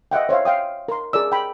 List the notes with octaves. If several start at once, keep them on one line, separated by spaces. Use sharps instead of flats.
D#5 E5 F#5 G5
C5 C#5 E5 F5
F5 G5 D#6
A#4 A#5 C6
G#4 A#4 D5 E6
G5 B5